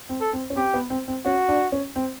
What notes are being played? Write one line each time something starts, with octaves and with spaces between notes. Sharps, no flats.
C4
A4
C4
C#4
C4 G4
B3
C4
C4
C#4 F#4
D4
C#4
C4